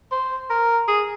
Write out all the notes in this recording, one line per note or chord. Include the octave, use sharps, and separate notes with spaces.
C5
A#4
G#4